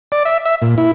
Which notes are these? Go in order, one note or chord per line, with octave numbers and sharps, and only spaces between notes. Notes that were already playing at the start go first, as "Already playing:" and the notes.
D5
E5
E5
A#2
E4